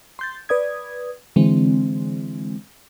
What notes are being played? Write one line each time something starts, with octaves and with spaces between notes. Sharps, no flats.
C6 G6 A6
B4 D5 D#6 G#6
D3 E3 G#3 C4